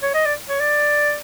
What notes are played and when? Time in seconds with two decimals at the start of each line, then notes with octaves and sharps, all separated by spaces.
0.02 C#5
0.14 D#5
0.25 D5
0.49 C#5
0.60 D5